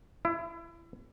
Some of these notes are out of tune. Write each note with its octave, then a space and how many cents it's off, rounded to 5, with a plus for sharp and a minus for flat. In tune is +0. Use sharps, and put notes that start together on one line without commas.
E4 +30